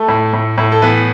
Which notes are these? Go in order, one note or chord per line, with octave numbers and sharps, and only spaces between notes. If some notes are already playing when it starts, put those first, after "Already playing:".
Already playing: A3 A4
A2
A2
A2
A4
E3 B3 B4